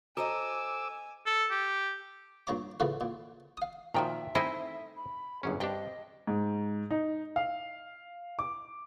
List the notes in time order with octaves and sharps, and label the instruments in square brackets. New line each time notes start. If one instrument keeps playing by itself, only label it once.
[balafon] F#4 A#5 [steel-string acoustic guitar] A4 C5 D#5 [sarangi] G#5 [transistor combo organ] D6 E6
[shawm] A4
G4
[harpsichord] G2 A#2 C#5 A#5 D6
A2 C#3 F3 A#4 B4
A#2
F5 D#6
[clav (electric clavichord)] A#2 D#3 F3 [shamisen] F#4 G5 A#5 [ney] E5
[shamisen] A3 C4 D#4 [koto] E4 [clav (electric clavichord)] C5 D#5 G#5
[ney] B5
[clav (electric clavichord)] G1 F#2 C#4 [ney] G#4
[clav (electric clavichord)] G2 D4 [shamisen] C4 G4 [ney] D#5
[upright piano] G#2
D#4
F5
D6